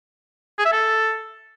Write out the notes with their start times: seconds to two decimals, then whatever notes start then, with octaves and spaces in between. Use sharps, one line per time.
0.59 G#4
0.66 E5
0.72 A4